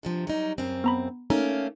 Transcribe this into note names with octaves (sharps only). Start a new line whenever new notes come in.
G2 C3 F3
F#3 G3 D#4
F#2 C#3 C4
B3 A#5 B5
A3 A#3 C#4 D#4